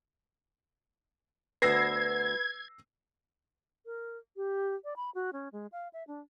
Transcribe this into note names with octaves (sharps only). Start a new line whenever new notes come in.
D2 B3 B4 C5 E6 G#6 A#6 C7
A#4
G4
D5
B5
F#4
C#4
G#3
F5
E5
D4